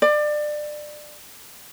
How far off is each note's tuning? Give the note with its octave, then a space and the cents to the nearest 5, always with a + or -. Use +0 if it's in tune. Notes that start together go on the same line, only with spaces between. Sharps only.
D5 +25